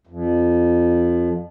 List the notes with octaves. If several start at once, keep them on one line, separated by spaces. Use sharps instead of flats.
F2